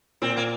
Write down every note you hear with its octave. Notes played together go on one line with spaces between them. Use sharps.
A#2 C4
A#3